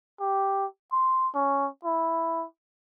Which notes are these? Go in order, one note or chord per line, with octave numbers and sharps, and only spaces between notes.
G4
C6
C#4
E4